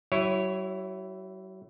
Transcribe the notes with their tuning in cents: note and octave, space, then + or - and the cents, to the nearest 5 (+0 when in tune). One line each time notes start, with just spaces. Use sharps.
F#3 +40 E4 +0 C#5 -5